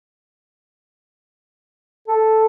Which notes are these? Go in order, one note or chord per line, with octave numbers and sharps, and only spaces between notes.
A4